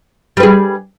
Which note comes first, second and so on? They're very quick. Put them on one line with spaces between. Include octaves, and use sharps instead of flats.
G3 B4 G#4